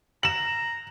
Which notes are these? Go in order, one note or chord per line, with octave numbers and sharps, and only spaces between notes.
A#5 E7 F#7